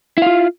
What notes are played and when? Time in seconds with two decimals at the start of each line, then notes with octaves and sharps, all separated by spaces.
0.18 E4
0.22 F5
0.26 F4